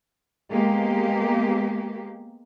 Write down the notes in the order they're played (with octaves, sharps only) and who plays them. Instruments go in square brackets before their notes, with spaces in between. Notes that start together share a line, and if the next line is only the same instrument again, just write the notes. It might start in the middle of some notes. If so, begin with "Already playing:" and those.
[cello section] G#3 A#3 B3 G4